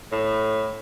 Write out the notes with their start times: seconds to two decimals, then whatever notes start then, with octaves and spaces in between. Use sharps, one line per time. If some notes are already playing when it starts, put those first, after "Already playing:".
0.12 A2